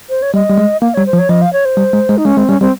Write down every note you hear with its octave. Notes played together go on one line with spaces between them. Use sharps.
C5
C#5
G3 D#5
G3
G#3
A#3 F5
G3 C#5
C5
F3
C#5
F3 D#5
F5
C#5
C5
G3
G#3
G#3
D#4
G#3 C#4
G#3 C4
G3 C#4
G3 C4